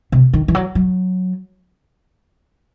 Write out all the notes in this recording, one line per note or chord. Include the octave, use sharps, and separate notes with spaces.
C3
D#3
E3
F#3
F#3